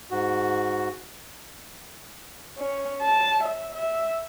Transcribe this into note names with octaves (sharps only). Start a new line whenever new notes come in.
G#2 F#4
C#4
A5
E5
E5